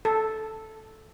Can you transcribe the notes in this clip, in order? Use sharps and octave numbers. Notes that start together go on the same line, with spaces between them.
A4